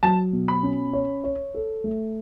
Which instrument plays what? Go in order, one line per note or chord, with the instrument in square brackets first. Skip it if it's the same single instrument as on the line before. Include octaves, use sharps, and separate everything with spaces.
[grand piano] F#3 [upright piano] A5
[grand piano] B2
[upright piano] B5
[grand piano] C#4
C#5
C#5
A4
A3